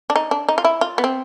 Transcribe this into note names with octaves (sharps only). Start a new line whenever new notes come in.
D4
D#4
D4
D#4
F4
E4
F4
B3
C4